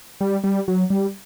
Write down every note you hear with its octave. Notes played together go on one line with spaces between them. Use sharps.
G3
G3
F#3
G3